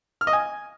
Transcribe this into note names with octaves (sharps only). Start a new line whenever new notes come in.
F6
D#5
G#5